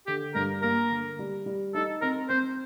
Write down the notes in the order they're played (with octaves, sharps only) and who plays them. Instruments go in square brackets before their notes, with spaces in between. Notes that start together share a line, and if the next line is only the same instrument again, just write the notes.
[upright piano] D3 [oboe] G4
[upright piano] G2 [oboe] A#4
[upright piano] A#3 [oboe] A#4
[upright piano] D3
G3
G3
[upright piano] D#4 [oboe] A4
[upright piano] C4 [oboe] A#4
[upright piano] C4 [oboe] C5